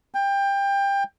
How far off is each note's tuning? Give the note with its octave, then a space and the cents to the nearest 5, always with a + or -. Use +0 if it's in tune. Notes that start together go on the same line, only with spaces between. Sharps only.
G5 +20